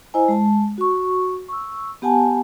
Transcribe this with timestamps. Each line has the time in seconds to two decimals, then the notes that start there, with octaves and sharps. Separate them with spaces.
0.14 E4 C5 D#5 G#5 A#5
0.28 G#3 A5
0.78 F#4 C#6
1.49 C#6 E6
2.02 B3 G4 F#5 G#5 A5